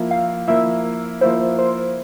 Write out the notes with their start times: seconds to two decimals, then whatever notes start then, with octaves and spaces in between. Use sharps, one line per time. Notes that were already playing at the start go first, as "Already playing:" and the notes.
Already playing: F3 A#3 E4
0.11 F5
0.48 F3 A#3 E4 E5
1.21 F3 A#3 E4 C5
1.58 C5